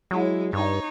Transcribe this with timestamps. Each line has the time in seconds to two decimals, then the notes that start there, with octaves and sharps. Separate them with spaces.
0.11 F#3 G#3 E4
0.53 G2 D#4 C#5